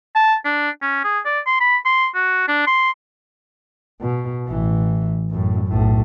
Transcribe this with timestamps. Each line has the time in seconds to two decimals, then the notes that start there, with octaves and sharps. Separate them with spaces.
0.15 A5
0.45 D4
0.82 C#4
1.04 G#4
1.25 D5
1.46 C6
1.60 B5
1.85 C6
2.15 F#4
2.48 D4
2.67 C6
4.01 B2
4.48 A1 E3
5.31 F#2 A2
5.67 B1 A2